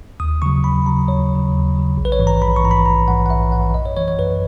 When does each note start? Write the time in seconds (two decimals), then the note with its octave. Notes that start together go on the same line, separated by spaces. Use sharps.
0.20 D#2 D#6
0.42 C#3 F#3 C#6
0.64 D#2 B5
0.86 C#3 F#3 A#5
1.08 D#2 C#5
1.31 C#3 F#3
1.53 D#2
1.75 C#3 F#3
1.97 A#1
2.05 B4
2.12 C#5
2.19 G#2 E3
2.27 A#5
2.42 A#1 B5
2.56 C#6
2.64 G#2 E3 A#5
2.71 B5
2.86 A#1 A#5
3.08 G#2 E3 F#5
3.26 F#5
3.30 A#1 E5
3.52 G#2 E3 F#5
3.74 F#2 D#5
3.86 C#5
3.97 E3 C#5
4.08 C#5
4.19 F#2 B4